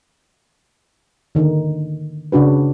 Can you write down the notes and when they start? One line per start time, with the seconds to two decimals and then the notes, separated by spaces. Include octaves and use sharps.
1.35 D3 D#3
2.32 C#3 D4 F#4 B4